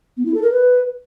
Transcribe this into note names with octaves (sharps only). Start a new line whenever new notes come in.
B3
E4
A4
A#4
B4